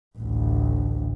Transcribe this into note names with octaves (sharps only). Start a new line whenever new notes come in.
A1 D2